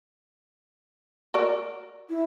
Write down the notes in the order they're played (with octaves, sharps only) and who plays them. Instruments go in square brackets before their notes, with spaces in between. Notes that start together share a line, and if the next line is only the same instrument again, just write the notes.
[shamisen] F#4 A#4 D5
[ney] E4